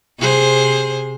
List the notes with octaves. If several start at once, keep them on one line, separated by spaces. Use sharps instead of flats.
C3 G#4 C5